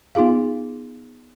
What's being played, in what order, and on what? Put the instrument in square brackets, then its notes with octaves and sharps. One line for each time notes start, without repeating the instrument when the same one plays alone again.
[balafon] B3 D#4 F4 G#4 F5